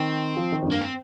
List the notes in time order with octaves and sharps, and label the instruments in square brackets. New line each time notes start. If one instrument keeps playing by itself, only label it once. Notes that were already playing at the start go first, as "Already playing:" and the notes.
Already playing: [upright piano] D#3 [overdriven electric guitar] C4
[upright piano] F3
D#3
F2
[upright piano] G2 [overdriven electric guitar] A#3
[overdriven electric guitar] C4